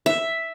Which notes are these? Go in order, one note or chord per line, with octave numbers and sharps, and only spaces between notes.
E5